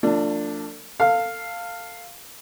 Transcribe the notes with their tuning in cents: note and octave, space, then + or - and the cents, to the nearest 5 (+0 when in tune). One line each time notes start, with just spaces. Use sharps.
F3 +0 A3 +45 D4 +0
A4 +30 F5 +0